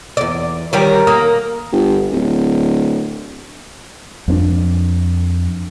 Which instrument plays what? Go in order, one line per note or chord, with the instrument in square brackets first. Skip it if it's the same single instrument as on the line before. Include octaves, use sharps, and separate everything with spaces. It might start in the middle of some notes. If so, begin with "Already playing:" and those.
[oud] E2 D5
[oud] D#3 G3 G4 [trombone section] A#4 [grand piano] C#5
[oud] A#3 [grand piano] D#6
[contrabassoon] G1
D1
[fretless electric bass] F2 B3 D4